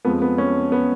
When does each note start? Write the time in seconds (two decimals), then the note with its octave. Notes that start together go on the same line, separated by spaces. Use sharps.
0.05 F2 F3 G#3 B3
0.22 B3
0.38 C#4
0.72 B3